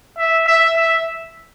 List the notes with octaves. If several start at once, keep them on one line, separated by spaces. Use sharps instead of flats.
E5
E5
E5